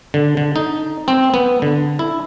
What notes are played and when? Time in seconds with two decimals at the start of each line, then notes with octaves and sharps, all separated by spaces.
0.14 D3
0.37 D3
0.56 D#4
1.08 C4
1.34 B3
1.62 D3
1.99 E4